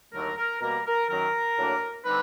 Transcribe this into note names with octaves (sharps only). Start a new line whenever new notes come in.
D#2 D3 F#3 A3 A#4
A#4
B2 G3 A#3 A#4
A#4
F#2 D#3 F#3 A#4
A2 F#3 A#3 D4
D3 G3 C4 D#4 B4